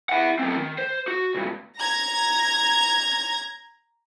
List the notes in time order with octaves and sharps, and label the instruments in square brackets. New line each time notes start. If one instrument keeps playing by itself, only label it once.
[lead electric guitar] E4 F#5
F#3 C4
D#3
C5
F#4
C#2 G2
[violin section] A#5 G#6 A#6